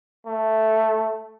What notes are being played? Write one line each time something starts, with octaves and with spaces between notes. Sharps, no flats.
A3